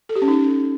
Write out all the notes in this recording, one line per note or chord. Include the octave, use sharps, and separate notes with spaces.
A4
G4
C#4
D#4